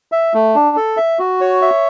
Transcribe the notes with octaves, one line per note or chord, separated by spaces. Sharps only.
E5
A3
D4
A4
E5
F#4
C#5
E5